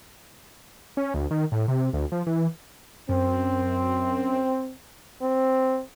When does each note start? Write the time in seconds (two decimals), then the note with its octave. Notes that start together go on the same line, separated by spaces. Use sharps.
0.97 C#4
1.14 D2
1.31 D#3
1.52 A2
1.68 C3
1.93 D2
2.12 F3
2.27 E3
3.09 F#2 C4
5.21 C4